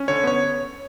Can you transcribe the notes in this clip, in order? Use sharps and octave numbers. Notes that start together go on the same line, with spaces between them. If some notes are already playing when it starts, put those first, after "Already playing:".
Already playing: C#4
D3 C#5
B3 C#5